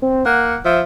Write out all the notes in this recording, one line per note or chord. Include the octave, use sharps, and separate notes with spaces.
C4
A#3 F#5
F3 E5